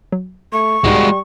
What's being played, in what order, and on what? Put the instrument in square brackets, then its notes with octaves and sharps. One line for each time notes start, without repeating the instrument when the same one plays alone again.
[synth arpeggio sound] F#3
[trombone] A3 [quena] C#6
[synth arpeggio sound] C2 G#2 D#4 [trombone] G3 [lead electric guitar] G#3 F#4